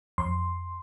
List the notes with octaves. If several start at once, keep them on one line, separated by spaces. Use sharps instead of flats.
F2 C6